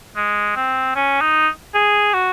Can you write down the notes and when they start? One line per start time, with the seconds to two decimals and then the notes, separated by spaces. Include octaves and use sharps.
0.16 G#3
0.56 C4
0.96 C#4
1.21 D#4
1.74 G#4
2.14 F#4